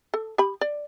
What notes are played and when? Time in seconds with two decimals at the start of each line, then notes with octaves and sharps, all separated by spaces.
0.14 A4
0.38 G4 B5
0.61 D5